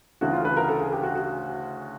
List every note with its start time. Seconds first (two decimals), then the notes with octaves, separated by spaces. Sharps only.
0.21 D2 C#3 E3 F#4
0.33 F4
0.45 B4
0.57 A#4
0.68 A4
0.80 G#4
0.92 G4
1.03 F#4
1.15 F#4